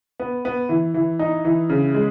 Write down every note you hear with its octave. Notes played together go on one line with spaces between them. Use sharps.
B3
B3
E3
E3
D#4
E3
C#3
G#3